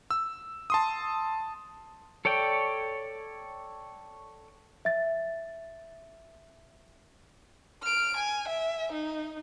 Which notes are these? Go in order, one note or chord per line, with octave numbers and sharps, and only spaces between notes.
E6
A5 C6 D#6
A4 C#5 D5 G5
E5 A6
F6 D7
G#5
E5
D#4